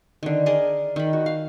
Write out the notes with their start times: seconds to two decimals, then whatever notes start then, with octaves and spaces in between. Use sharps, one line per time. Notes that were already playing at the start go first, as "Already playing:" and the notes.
0.23 D3 D#3
0.46 G#4 A#4 D5 D#5
0.96 D#3 B5
1.13 F#4
1.26 F5